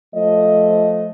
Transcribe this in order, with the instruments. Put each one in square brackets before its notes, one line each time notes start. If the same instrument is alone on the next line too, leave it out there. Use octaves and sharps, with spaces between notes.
[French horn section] F3 A3 D#5